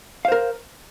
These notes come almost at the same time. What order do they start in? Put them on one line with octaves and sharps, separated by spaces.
F5 C5 A#4